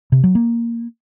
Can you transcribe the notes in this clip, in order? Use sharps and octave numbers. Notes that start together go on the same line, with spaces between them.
C3
F#3
A#3